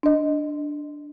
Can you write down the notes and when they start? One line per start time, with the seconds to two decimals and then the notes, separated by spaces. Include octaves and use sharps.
0.03 D4 D#5